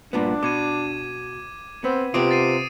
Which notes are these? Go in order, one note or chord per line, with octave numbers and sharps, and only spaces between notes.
G2 A#2 B3 D4
B2 D6 G#6 D#7
B3 C4
C3 B3 C4 F4 D6 D#6 D7
A6 C7 D#7